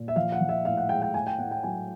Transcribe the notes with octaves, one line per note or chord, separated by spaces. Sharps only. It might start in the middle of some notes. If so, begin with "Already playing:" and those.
Already playing: A#2
E5
F3 F5
F#5
F3
E5
A2 F5
F#5
G#3 G5
G5
A2 G#5
G5
A2 F#5
G5
F#3 G#5